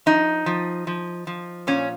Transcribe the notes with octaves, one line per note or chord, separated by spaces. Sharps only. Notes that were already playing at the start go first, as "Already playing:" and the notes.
F3 D#4
F3
F3
F3
A#2 C#4